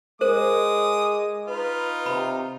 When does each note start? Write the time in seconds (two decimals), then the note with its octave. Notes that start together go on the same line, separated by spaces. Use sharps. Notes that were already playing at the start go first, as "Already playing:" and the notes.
0.21 G#3 A#4 C5 D6 D#6
1.48 D#4 F4 B4
2.06 C3 B5